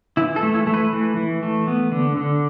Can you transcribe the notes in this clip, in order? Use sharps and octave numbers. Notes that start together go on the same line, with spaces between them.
E3 E4
A4
A3
E4
A3
B4
E3
E3
A3
B3
D3
D3